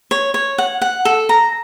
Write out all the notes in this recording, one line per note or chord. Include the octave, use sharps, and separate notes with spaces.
C#5
C#5
F#5
F#5
A4
A#5